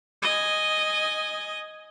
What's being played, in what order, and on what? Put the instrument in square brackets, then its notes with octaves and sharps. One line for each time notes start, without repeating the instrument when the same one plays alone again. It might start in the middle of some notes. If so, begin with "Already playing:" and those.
[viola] D#5 G#5